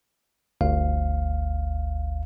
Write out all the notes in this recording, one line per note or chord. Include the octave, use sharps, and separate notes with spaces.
G1 D2 F5